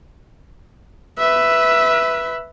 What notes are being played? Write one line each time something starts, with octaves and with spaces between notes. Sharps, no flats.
B4 E5